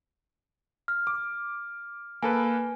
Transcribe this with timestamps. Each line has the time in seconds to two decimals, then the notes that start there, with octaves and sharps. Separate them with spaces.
0.88 F6
1.07 D6
2.22 A#3 A4 B4 G#5